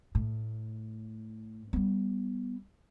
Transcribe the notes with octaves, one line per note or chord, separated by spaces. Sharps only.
A2
G3 B3